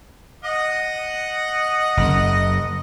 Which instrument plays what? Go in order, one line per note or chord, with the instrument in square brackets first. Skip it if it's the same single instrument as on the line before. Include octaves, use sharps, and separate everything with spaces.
[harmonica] D#5 F#5 D#6
[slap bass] F#1